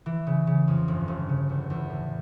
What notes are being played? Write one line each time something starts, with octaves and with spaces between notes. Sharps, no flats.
E3
C#3
C#3
F2
G1
G1
C#3
E2
E2
A2